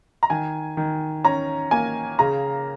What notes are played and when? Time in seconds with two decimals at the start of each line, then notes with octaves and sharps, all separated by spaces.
0.23 A#5
0.30 D#3 G#5
0.77 D#3
1.24 C#4 A#5
1.71 A#3 G#5
2.19 C#3 A#5